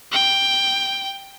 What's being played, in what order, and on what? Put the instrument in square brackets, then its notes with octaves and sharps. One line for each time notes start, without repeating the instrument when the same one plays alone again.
[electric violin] G5